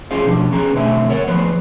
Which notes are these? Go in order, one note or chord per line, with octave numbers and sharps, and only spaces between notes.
C#4 F4 G#4 C5 F5
B2 F3 D4 G4
B3 C#4 G#4 A#5
B2 D3 A3 C4 E5 G#5
A#4 C#5 F#5
D2 F3 B3 B4 C5